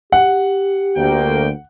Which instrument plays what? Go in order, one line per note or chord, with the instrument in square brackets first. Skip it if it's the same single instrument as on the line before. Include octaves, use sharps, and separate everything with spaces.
[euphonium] G4 [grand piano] F#5
[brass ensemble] D2 A#3 G5